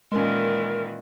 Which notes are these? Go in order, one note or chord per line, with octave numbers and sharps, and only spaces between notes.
A#2 D#3 E3 G#3 C#4 A#4